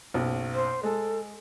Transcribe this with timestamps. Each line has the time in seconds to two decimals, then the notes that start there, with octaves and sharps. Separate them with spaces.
0.14 F#1 B1
0.53 C5
0.83 G#3 A4